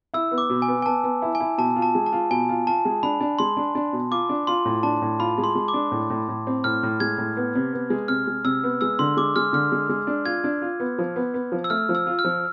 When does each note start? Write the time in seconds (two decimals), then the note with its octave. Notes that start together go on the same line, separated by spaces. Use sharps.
0.14 E4 E6
0.32 B3
0.38 D6
0.50 B2
0.62 G#5
0.68 B3
0.82 G#5
0.86 B3 A5
1.04 B3
1.22 E4
1.35 G#5
1.40 E4
1.58 B2 A5
1.76 F4
1.82 A5
1.95 G#3
2.06 A5
2.12 F4
2.31 B2 G#5
2.49 F4
2.67 F4 A5
2.85 G#3
3.03 D4 B5
3.20 D4
3.39 G#3 C6
3.57 D4
3.75 D4
3.93 B2
4.11 F4 D6
4.29 D4
4.47 F4 C6
4.65 A2
4.83 D4 A5
5.02 A2
5.19 F4 B5
5.38 G#3
5.44 C6
5.55 G#3
5.68 D6
5.74 D4
5.92 A2
6.10 A2
6.28 A2
6.47 C4
6.64 A2 F6
6.83 A2
7.00 G#3 G#6
7.18 A2
7.37 B3
7.55 C3
7.73 B3
7.90 G#3
8.08 C3 F6
8.27 G#3
8.44 C3 E6
8.64 B3
8.81 G#3 E6
8.99 D3 C6
9.17 G#3 D6
9.36 G#3 F6
9.53 D3 F6
9.72 G#3
9.89 G#3
10.07 D4
10.25 F4 G#6
10.44 D4
10.62 F4
10.80 B3
10.99 F3
11.16 B3
11.34 B3
11.52 F3
11.64 E6
11.70 A3 F6
11.89 F3
11.95 E6
12.07 F4
12.19 F6
12.25 F3